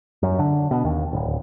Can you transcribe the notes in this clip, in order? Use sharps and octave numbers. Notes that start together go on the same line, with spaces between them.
F#2
D3
B2
D#2
D1